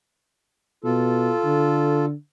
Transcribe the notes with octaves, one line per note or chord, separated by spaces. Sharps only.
B2 F4 A4
D3